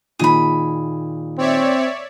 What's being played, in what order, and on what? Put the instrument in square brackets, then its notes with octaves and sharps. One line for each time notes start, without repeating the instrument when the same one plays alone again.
[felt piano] A#2 D#3 [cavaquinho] G#4 B5
[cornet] C4 [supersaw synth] C#5 D5 E5